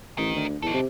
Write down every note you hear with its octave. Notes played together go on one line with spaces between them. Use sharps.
A1 A#4 D#5
D2
E2 D#4 A4
C3